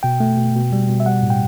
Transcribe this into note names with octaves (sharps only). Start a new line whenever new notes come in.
B2 G5
A3
B2
B2
G3
B2
E5
G3 F#5
A2
G5